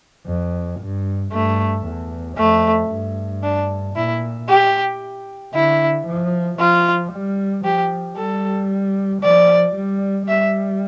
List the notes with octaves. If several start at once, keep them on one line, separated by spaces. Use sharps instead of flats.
F2
G2
G2 A3
E2
F2 A3
G2
D4
A#2 E4
G4
D3 E4
F3
F3 F4
G3
F3 G4
G3 A4
F3 D5
G3
G3 E5